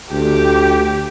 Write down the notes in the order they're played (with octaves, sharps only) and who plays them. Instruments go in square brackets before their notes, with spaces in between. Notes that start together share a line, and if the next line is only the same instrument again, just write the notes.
[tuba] D2 [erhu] G4